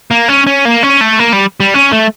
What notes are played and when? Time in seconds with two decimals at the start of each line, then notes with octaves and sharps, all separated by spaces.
0.11 A#3
0.28 C#4
0.47 C#4
0.65 A#3
0.83 C#4
1.01 A3
1.19 A#3
1.33 G3
1.60 G3
1.74 C#4
1.92 A3